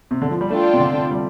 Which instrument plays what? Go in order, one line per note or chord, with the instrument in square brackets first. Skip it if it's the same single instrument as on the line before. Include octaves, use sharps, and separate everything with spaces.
[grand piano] C3
D3
F3
G3
[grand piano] A3 [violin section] D4 F4 A4 D5 G5
[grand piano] C3
D3
G3